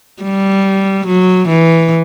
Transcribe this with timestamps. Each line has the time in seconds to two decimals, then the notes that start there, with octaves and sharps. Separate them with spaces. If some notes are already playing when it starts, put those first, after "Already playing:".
0.23 G3
1.07 F#3
1.49 E3